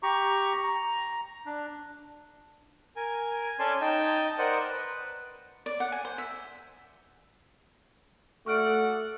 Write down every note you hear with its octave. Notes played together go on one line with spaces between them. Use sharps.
G4 A#5 C#6
A#5
D4
A#4 G#5
C#4 A4 D5 G#5 A5 C6
D#4 D#5 G5 A5
A#4 C5 D5 D#5 F#5
B4
D5
F#5
G#5
C5
E5
A3 F#4 A4 D5 F#5 C#6 F6 D7